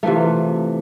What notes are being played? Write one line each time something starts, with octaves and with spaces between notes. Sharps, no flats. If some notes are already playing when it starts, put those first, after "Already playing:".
C3 E3 F3 A3